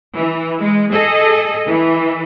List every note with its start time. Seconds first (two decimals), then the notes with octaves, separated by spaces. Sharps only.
0.16 E3
0.61 G#3
0.90 G#4 A4 D#5
1.69 E3